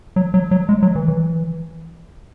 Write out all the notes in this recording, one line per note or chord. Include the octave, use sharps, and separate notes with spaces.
F#3
F#3
F#3
G#3
F#3
E3
E3